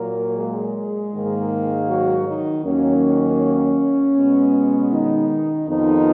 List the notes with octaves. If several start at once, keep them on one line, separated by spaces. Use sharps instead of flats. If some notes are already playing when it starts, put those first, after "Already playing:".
Already playing: A#2 F#3 A#3 A#4
G#3 G#4
G#2 D#3 A#3
F#3 F#4
D#3 D#4
D#2 D#3 F#3 A#3 C#4
B2 G#3 B3
D#3 D#4
F2 D#3 F3 B3 D#4